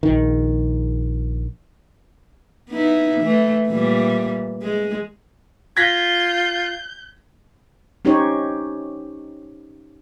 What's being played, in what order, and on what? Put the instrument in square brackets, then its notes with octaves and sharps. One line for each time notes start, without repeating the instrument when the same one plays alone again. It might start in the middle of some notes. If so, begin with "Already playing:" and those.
[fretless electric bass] A#1 D#3
[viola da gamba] B3 D#4 E4
E3 A3
A#2 E3 G3
G#3
[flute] F4 [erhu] G6 [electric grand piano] G#6 A#6 B6
[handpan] C#4 D#4 G4 C5 C#5